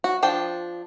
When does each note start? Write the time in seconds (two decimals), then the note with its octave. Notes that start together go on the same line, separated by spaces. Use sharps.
0.04 F#4
0.23 F3 D4 G5